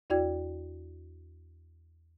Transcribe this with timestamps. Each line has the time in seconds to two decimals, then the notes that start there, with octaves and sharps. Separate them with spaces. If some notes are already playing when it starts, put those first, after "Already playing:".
0.10 E2 E4 F#4 D5 G5 G#6